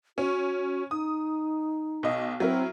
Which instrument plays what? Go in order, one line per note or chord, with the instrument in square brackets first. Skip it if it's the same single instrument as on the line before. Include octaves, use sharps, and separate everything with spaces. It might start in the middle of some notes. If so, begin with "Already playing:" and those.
[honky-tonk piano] C#4 [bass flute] F#4
[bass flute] D#4 [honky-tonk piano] D#6
[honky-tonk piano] B1 D#5
[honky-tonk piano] F#3 E4 A#4 [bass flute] C4